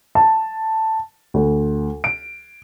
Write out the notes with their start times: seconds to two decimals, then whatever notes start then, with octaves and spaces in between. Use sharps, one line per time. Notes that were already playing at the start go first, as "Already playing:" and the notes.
0.15 A5
1.34 D2
2.04 D7